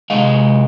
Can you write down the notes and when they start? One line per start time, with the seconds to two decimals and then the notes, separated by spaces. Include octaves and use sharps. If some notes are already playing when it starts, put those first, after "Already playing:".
0.10 D#3 G#3 D#5 F5
0.15 C3